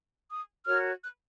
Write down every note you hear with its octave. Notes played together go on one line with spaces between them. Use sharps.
D#6
F#4 A#4 C#5 F6
F#6